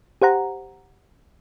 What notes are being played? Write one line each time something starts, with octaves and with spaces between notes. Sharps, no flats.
G4 C5 F#5 A#5